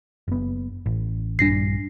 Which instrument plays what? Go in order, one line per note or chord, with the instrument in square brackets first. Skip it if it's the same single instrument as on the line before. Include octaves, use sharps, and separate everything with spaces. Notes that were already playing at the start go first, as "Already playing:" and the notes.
[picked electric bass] F#1 B3
A1
[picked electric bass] A#1 G2 G3 [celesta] D4 A#6 C7